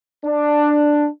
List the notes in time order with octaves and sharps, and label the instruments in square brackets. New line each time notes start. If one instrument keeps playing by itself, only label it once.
[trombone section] D4